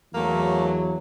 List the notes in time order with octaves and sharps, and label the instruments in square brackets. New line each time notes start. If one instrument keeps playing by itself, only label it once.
[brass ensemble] E2 E3 F#3 [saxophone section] A3 A#3